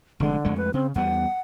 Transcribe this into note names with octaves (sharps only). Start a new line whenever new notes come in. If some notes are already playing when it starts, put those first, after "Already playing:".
F1 D3 G#3
F2 G#3 A3
B4
C#3 C4
E2 G3 B3 F#5